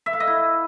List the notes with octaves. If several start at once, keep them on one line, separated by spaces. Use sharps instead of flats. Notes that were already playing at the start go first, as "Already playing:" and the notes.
E5
F5
D#5
E4